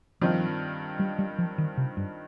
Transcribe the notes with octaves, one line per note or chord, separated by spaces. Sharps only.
G2 D#3 F3 C4 F4
G3
G3
F3
D#3
C3
G2